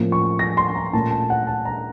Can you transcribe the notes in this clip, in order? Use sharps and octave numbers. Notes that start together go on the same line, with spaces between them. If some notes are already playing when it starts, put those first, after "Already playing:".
Already playing: A2 F3 A#3 C#4
C#6
A#6
C6
A#5
A#2 A3 C#4 A5
A5
F#5
A5
A#5